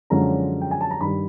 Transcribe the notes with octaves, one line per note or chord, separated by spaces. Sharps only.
F#2 D3 F3 G#3 C#4 A#5
G5
G#5
A5
A#5
G2 D#3 G3 B5